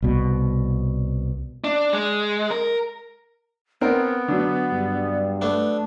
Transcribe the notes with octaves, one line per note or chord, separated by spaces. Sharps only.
C2 B2
D4
G#3
A#4
B3 C4 A#4
D3 F#3
G2 G3
A3 B3 D4